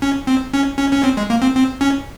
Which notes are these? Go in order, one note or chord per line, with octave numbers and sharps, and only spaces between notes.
C#4
C4
C#4
C#4
C#4
C4
G#3
A#3
C4
C4
C#4